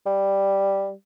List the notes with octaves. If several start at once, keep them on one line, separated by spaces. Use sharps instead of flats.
G3